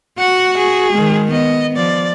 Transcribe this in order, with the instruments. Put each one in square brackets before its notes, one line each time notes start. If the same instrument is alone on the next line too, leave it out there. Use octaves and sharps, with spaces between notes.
[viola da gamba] F#4 [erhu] F#5
[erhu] G#4
[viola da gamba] D#3 G#3
[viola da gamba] B3 [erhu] D#5
[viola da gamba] F3 [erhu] D5